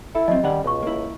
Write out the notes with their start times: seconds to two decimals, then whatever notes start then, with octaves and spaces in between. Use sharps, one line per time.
0.15 E4 A4
0.28 F3 F#3 C4 D#5
0.44 D#3 G3 C#4 F#5
0.64 C#2 B2 F4 C#5 C#6
0.83 A#3 E4